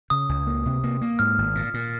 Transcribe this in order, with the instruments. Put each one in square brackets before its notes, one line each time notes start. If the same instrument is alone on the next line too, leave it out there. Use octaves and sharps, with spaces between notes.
[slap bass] C#3 [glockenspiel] D#6
[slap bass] C#2
A#3
C3
A#3
A#3
[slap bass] G#2 [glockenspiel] F6
[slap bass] G#1
A#2
A#2